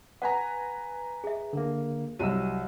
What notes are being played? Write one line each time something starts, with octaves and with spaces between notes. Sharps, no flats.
B4 F#5 G#5 A#5
G#4 E5
D3 A#3
C2 F#3 D#5 E6 D#7